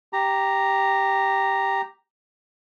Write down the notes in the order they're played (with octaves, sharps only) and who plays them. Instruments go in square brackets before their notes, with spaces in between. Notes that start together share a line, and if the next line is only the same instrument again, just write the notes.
[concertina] G4 A#5